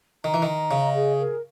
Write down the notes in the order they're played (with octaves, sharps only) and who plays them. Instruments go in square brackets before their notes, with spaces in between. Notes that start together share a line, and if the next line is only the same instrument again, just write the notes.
[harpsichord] D#3 [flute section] A#5
[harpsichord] E3
D#3
[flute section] A#5
[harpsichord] C#3 [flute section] D#5
[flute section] G#4
A#4